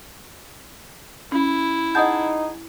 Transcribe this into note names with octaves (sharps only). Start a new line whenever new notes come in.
C#4 E4
D#4 G#4 D#5 F#5 A5 D#6 G6